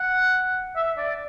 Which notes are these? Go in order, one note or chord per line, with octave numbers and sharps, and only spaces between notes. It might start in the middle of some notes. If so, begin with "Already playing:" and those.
Already playing: F#5
E5
D5